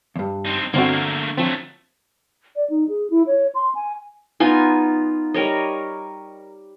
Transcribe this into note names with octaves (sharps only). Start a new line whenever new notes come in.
E2 G2
C4 D#4
G1 D3 A3 A#3 C4 F#4
F3 F#3 A3 C4
D5
D#4
G#4
E4
C#5
C6
G#5
B3 D#4 F4 G#5
G3 A#4 C#5 D#5